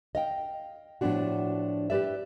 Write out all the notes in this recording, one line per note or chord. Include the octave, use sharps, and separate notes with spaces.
D#5 F5 G5
A2 F3 B3 C4 D4 F#4
G4 G#4 B4 D5 E5